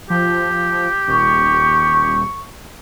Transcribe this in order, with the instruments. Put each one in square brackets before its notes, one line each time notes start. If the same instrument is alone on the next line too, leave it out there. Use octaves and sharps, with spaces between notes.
[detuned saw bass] F3 [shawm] G4
[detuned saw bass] D#1 [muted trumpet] C#6